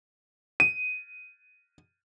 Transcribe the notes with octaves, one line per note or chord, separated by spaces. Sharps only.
D#7